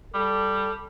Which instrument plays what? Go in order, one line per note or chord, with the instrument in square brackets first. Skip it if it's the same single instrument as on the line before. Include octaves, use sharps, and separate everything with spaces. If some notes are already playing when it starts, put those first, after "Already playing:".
[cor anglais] G3 [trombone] A4